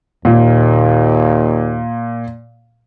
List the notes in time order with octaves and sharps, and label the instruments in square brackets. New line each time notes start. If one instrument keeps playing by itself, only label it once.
[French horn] D#2 [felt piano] A#2